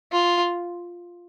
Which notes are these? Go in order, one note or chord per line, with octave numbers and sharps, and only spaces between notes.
F4